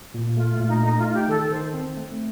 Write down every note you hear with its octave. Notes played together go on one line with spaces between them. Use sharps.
A#2
A3 F4
F4
A#2
D#4
A3 D#4
F4
D#4
G4
D#3 A4
D#3 C5
C4
A3